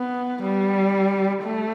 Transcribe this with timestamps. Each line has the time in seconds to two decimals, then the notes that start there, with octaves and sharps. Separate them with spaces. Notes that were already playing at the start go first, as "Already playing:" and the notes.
Already playing: B3
0.43 G3
1.43 A3